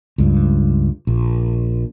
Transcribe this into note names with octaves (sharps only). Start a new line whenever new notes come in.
C#2 G2
A#1